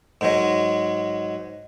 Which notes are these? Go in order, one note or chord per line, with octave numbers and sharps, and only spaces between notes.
G#2 F#3 G#3